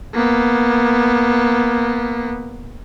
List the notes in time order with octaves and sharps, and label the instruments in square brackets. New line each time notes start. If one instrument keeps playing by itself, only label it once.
[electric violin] A#3 B3